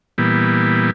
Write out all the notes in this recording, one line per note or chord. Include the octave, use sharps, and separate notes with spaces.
A#2 E3 G3 B3